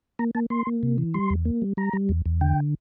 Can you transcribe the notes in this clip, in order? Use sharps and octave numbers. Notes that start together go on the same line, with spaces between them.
A#3 A#5
A#3 A5
A#3 C6
A#3
C3
E3
G3 C6
E2
A#3
G3
G3 A#5
G3
E2
E2
D3 G5